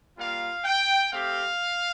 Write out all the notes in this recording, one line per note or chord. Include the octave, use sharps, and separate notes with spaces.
G3 A#3 F4 F5
G5
A3 C4 G4 F5